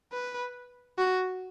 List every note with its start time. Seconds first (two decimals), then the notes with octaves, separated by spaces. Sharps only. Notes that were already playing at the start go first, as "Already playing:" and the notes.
0.12 B4
0.98 F#4